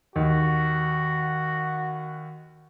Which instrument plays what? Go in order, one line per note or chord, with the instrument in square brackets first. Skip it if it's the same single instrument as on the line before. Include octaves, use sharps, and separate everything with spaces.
[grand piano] D#2 [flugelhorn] F#4